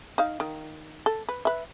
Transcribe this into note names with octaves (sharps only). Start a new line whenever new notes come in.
D#4 F5
D#3
A4
B4
B4 E5